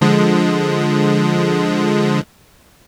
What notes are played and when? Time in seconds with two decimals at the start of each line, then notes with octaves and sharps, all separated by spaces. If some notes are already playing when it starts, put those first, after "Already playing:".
0.01 D3 F3 G#3